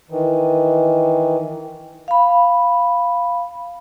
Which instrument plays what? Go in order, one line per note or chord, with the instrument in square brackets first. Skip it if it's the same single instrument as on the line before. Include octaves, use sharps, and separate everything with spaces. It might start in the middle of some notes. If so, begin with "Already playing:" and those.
[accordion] D#3 E3
[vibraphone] F5 B5